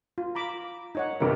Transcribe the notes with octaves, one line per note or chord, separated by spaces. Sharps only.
F4
A#5 B5 D6
D#4 C#5 F#5
G1 C3 A#4 B4